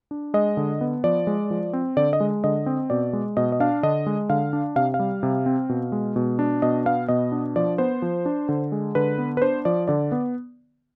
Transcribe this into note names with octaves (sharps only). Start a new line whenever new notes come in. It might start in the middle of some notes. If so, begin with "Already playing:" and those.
D4
G#3 D#5
D3
B3
F3 D5
G#3
F3
C4
D3 D5
D#5
G#3
D3 D#5
C4
B2 D5
G#3
B2 D#5
D#5
D4 F5
D3 D#5
G#3
D3 F5
D4
C3 F5
F5
G3
C3
C4
B2
G#3
B2
D4
B2 D#5
B3 F5
B2 D#5
D4
F3 D5
B3 C5
F3
D4
D3
G#3
D3 B4
B3
B4
D4 C5
F3 D5
D3 D5
B3